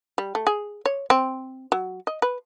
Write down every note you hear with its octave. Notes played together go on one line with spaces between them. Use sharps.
G3
A3
G#4
C#5
C4
F#3
D#5
B4